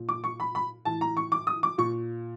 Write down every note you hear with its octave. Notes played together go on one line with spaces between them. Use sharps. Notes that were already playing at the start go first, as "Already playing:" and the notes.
Already playing: A#2
D6
C#6
B5
B5
A2 E3 A5
A#5
C#6
D6
D#6
D6
A#2 C#6